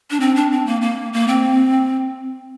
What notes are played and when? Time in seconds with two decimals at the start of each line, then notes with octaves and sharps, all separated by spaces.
0.11 D4
0.20 C4
0.36 D4
0.51 C4
0.66 A#3
0.82 A#3
1.13 A#3
1.28 C4